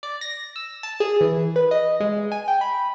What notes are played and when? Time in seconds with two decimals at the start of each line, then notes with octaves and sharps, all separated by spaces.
0.03 D5
0.21 A#6
0.56 E6
0.83 A5
1.00 G#4
1.21 E3
1.56 B4
1.71 D#5
2.00 G#3
2.32 G#5
2.48 G5
2.61 B5